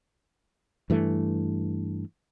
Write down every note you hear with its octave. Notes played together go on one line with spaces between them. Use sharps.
G2 E3 A3